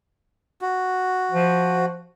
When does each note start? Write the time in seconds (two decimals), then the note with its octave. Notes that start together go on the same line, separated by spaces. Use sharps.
0.61 F#4
1.32 F3